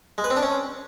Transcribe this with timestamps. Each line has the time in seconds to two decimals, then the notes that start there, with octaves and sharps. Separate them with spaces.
0.18 G#3
0.24 B4
0.30 C4
0.37 D4
0.43 C#4